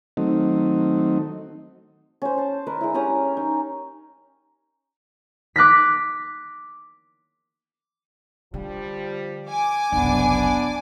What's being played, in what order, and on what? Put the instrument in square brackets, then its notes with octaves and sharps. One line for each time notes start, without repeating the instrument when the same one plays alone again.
[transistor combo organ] D#3 F#3 A3 C4 D#4
[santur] C#4 C5
C5 A5
A#4 B4 D#5
G#3 D4 E4
C#4 G4 A#5 D#6
D#4
[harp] D6 F#6 A#6 B6
[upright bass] D3 [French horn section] F3 G3
[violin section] G#5 D6
[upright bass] F#1 C2 [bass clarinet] B3 [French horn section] D4